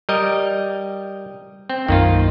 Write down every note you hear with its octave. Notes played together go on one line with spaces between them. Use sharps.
G3 A#4 D#5
C4
B1 F#2 D#3 A#3 F4